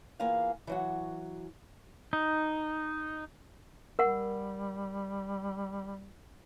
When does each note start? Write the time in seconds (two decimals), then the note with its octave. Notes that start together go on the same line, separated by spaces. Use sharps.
0.20 E2 A#3 F4 G#4 F5
0.67 E3 F#3 F#4
2.13 D#4
3.99 G3 A#4 F#5